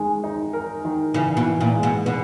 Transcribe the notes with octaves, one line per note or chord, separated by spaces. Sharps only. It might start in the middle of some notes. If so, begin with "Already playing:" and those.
Already playing: D#3 G#3
D#4
A#4
D#3
C#3 E3
B2
E3
A#2
G#3
B2
B2 B3